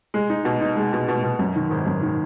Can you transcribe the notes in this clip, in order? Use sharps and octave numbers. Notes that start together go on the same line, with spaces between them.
G#3
D#4
B2
D#4
G#3
B2
B2
B2
F#2
D#3
G#1
F#2
D#3